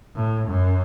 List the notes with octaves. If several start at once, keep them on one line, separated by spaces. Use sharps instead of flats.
A2
F#2